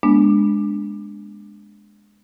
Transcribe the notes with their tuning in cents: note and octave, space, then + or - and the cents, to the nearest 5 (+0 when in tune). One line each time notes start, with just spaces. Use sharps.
G#3 +0 B3 -35 D4 +0